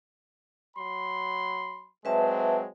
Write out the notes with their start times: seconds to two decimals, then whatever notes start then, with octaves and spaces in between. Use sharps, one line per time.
0.77 F#3 B5 C6
2.05 F#3 G#3 C4 B4 E5 A5